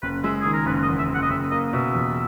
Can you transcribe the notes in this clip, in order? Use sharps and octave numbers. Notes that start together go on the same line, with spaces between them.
F#1 B4
G#3 E5
D#3 G#4
A#4
F#1 B4
D#5
E2
E5
F#1 F#5
D#5
F#1 E5
A#3 D#5
B2 E5
E2